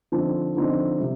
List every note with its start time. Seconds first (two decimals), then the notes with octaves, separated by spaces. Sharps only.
0.12 D3 F3 C4 D#4
0.56 D3 F3 C4 D#4
1.00 C3 G3